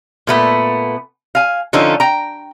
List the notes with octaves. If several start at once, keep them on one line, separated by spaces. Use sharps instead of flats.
A#2 A3 B3
F5 G#5
D3 F3 C#4 D#4 F4 A4
G5 A#5